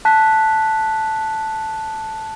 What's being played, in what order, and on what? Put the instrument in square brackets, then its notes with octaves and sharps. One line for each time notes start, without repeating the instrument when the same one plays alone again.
[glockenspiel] A5 F#6 B6